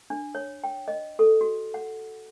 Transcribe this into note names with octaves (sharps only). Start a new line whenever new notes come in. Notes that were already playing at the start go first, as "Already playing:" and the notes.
D4
C#5
G5
D#5
A4
F#4
F#5